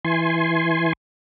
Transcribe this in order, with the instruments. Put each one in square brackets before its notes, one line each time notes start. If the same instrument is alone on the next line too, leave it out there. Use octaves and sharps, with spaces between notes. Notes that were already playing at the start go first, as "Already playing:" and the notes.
[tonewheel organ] E3 G#5 C6